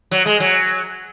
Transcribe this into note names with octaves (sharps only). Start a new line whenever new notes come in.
F#3
G#3
F#3